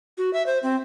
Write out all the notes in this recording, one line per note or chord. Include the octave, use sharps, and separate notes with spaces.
F#4
E5
C5
C4